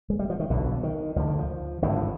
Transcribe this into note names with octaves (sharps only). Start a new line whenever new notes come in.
G#3
G3
F3
D#3
B1 B2 D3
D#3
D2 D3 F3
D#3
F3
G#1 G2 D3 D#3
F3